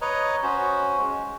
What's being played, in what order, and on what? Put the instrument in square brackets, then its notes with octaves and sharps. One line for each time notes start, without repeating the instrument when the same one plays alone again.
[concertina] B4 C#5 D#5 A#5
C#4 F#4 C5
G#3